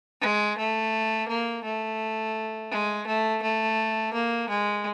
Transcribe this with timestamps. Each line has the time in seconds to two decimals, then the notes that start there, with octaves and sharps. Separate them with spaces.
0.21 G#3
0.58 A3
1.28 A#3
1.64 A3
2.71 G#3
3.06 A3
3.42 A3
4.13 A#3
4.49 G#3